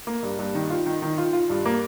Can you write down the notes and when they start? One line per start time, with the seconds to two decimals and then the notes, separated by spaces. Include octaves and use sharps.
0.07 A#3
0.23 G2
0.39 G2
0.55 D#3
0.70 F4
0.86 D#3
1.02 D#3
1.18 F4
1.33 F4
1.50 G2
1.66 A#3